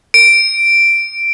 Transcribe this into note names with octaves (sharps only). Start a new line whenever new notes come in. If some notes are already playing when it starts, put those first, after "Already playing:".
D7